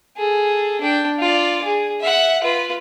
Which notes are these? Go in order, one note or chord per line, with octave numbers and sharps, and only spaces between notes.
G#4 A4
D4 G5
F4 D5
G#4
E5 F#5
F4 B4